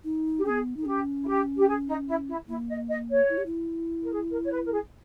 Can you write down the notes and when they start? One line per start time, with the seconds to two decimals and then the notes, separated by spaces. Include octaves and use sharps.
0.04 D#4
0.38 G4
0.45 C#4 G#4
0.50 B3
0.77 D#4
0.81 G#4
0.86 C#4 G4
1.22 E4
1.27 G4
1.57 G4
1.67 G#4
1.87 D#4
2.07 E4
2.28 E4
2.48 A#3 E4
2.69 D#5
2.89 D#5
3.09 C#5
3.29 E4
3.38 G4
3.46 E4
4.02 A#4
4.11 G#4
4.31 A#4
4.44 C#5
4.51 B4
4.65 A#4
4.72 G#4